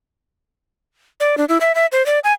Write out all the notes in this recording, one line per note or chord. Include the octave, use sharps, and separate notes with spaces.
D5
D4
E4
E5
E5
C5
D5
G#5